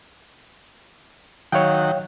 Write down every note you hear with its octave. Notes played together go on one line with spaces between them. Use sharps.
D#3 F#3 C#5 F5 G5